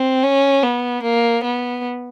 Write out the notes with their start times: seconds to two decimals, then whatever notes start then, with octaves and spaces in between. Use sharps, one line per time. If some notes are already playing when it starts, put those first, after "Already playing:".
Already playing: C4
0.23 C#4
0.63 B3
1.03 A#3
1.43 B3